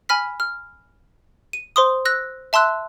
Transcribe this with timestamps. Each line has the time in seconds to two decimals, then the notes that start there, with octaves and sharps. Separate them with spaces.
0.09 G#5 B5 F6 B6
0.40 F6
1.53 D#7
1.76 C5 C6 D#6
2.05 E6 F#6 A#6
2.53 E5 A5 C6 E6 F#6